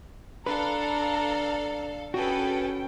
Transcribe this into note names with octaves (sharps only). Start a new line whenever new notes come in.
D4 A4 B4 F5 A#5
C#4 F#4 G#4 A4 B4 G5